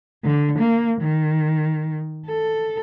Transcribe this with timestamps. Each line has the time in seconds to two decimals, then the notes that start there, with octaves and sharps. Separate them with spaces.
0.24 D3
0.59 A#3
1.01 D#3
2.27 A4